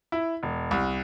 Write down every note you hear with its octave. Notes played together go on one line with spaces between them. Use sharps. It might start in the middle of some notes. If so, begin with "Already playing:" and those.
E4
E1
C2